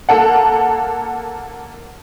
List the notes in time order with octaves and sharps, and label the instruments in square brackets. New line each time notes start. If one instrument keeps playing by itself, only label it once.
[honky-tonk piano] A#3 A4 F#5